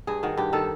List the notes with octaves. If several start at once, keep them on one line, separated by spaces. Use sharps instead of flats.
G2 G#4
D#3 F#4
G2 G4
D#3 A4